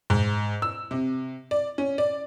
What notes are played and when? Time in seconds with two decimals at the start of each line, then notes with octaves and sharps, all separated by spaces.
0.10 G#2
0.62 E6
0.91 C3
1.51 D5
1.78 C#4
1.98 D5